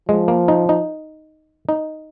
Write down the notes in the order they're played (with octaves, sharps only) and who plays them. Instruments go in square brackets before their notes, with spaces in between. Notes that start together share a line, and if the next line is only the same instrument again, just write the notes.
[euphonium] F3 [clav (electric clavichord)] G#3
[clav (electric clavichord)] A#3
D#4
D#4
D#4